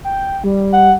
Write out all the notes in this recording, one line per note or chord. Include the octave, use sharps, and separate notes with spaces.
G5
G3
F#5